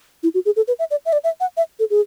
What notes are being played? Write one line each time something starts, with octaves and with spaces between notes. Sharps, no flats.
E4
F#4
G#4
A4
B4
E5
D5
E5
D5
E5
F#5
E5
A4
G#4